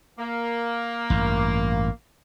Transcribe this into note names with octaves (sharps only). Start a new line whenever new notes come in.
A#3
A1 G2